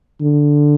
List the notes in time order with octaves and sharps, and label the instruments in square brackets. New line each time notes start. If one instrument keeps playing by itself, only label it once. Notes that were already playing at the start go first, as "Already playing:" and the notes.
[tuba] D3